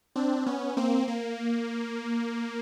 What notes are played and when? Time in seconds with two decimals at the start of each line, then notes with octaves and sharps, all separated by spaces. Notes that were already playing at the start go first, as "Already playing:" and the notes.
0.16 C4 D4
0.46 B3 C#4
0.77 A#3 C4
1.08 A#3